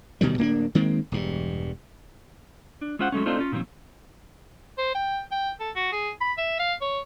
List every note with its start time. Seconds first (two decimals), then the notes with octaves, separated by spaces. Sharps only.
0.21 D1 B2 D#3 G3
0.38 D1 A#3 C#4 D4
0.75 D#3 G#3 A#3 C4
1.12 E1 G2
2.81 D4
2.99 G#3 C#4 F4 C5 F#5
3.12 F#3 G#3 A3 C#4
3.26 A3 C4 D4 D#4 F4 C5
3.39 C#4 F4
3.52 A#2 D#3 F3 F#3 C4
4.78 C5
4.95 G5
5.32 G5
5.60 A4
5.76 F#4
5.92 G#4
6.21 B5
6.38 E5
6.59 F5
6.81 C#5